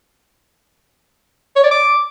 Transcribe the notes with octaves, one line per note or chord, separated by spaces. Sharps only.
C#5
D5
D6